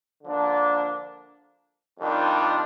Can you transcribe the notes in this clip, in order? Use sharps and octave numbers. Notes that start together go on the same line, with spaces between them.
D3 F3 A#3 D4
F2 D#3 G3 D4 F4